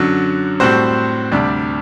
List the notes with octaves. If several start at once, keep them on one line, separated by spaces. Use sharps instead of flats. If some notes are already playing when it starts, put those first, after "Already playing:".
Already playing: F#2 D3 F#3
A2 G3 C4 F#4 C5
D2 C3 G3 D4